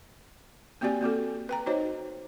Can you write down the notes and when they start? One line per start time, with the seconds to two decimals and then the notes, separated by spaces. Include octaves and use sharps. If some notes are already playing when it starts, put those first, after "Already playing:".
0.81 A#3 C4 F#4 G4 D5 G#5
1.01 A#3 C4 F#4 A4
1.49 B4 G5 A#5
1.66 D#4 F#4 C5 C#5 D#5